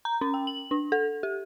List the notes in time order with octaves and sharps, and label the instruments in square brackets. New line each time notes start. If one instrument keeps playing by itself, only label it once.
[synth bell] A#5
C#4
G5
F#7
D4
A4
G4